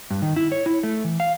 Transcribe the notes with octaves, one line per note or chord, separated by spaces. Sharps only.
G2
D#3
E4
C#5
E4
A3
E3
F5